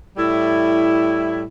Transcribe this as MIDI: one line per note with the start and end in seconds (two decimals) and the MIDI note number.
0.17 1.43 45
0.17 1.43 55
0.17 1.43 64